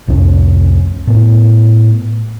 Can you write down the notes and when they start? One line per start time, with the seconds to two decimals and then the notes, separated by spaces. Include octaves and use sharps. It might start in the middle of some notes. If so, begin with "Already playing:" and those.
0.08 C2 F2 C#4
1.07 A2 B3